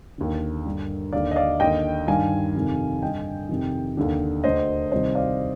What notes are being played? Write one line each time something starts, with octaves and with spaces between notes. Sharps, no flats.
D#2 D3
G2 D3
D#2 D3 D5 F5
D#5
D5 F5
D#2 D3 D#5 G5
G2 D#3 F5 G#5
F2 C3 D#3
G2 D3 D#5 G5
F2 C3 D#3
D#2 D3
D2 D3 C5 D#5
C2 C3 D#3 C5 D#5
D5 F5